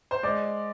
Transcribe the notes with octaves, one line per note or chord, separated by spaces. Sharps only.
C5
G#3 D5